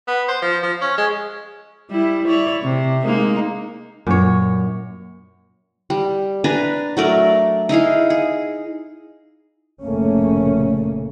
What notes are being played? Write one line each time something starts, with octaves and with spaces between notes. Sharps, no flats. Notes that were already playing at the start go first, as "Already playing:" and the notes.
B3
C5
F3
F3
C#4
G#3
G3 E4
E4 C#5 D5
C3
G#3 A#3 D#4
F#2 A#2 C#5
G3
D4 B4 G#5 A#5
F#3 A3 A#4 D5
D#4 E4 G#4 F5
G#4
F1 A#2 C#3 A3 A#3 C#4